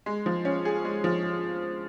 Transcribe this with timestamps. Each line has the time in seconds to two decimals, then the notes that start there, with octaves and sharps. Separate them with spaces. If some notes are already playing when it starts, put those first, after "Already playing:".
0.06 G#3
0.26 F3
0.45 C#4
0.65 G#4
0.85 G#3
1.04 F3